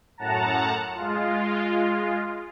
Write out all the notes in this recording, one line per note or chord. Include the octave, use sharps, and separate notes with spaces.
F#2 A2 F#5 A5 A#5
G#3 F4